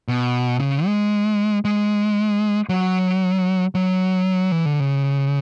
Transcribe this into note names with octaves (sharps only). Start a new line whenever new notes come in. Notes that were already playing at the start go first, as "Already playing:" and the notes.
B2
C#3
G#3
G#3
F#3
F#3
E3
D3
C#3